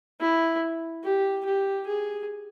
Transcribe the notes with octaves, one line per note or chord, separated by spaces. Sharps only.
E4
G4
G4
G#4